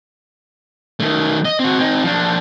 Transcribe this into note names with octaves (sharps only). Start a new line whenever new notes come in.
D#3 A3
D#5
C4 F#4
C4 D#4
F3 D4